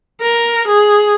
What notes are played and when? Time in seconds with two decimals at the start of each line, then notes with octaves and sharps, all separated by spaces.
0.21 A#4
0.67 G#4